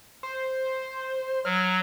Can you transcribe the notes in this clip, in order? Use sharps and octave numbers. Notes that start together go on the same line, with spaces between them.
C5
F#3 F6